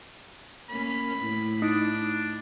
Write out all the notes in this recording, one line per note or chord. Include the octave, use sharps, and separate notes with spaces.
A#3 C#4 B5
A2 E4
D4 D#4